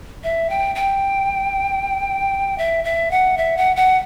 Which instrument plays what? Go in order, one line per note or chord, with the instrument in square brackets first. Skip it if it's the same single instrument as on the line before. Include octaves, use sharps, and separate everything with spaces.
[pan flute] E5
G5
G5
E5
E5
F#5
E5
F#5
F#5